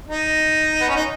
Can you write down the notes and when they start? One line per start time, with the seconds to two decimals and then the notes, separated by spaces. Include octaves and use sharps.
0.08 D#4
0.81 B3
0.89 C#4
0.96 D#4